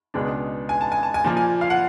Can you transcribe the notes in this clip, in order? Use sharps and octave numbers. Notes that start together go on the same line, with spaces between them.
C#2 B2 G#3 B3 D4
G#5
A5
G#5
A5
G#5
A#2 F3 A#3 A5
G#5
F5
F#5